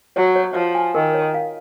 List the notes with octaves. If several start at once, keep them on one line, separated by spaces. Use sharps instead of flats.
F#3 C#5
C#5
F3 C#5
G#5
D#3 A#4
C#5
F5